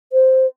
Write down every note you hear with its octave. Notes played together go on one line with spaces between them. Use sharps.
C5